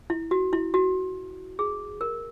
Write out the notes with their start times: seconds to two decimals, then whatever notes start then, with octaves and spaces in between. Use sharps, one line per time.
0.10 E4
0.31 F#4
0.53 E4
0.74 F#4
1.59 G#4
2.01 A#4